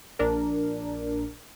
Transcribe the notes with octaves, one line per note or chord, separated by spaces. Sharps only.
A#1 D4 A#4